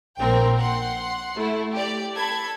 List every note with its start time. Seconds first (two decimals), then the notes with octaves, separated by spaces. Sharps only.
0.17 A#1 A#2 C4 A#4 G5
0.58 F#5 C6
1.35 A3 E4
1.73 G4 D5
2.15 A4 A5 B5 G#6